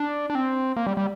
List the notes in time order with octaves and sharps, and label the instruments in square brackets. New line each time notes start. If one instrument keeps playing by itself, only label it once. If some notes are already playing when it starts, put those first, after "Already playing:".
Already playing: [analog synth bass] D4
D4
C4
A#3
G3
G3